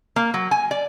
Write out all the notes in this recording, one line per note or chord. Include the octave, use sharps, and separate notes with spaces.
A#3
F#3
G#5
D5